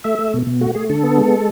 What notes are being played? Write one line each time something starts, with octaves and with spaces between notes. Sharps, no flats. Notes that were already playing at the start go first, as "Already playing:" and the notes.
A3 E5
A3
B2
B2
A3 F#4
A3 G#4
D3 A4
B3
G#3